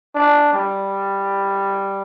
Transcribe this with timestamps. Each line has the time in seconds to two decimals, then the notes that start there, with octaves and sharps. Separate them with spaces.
0.15 D4
0.53 G3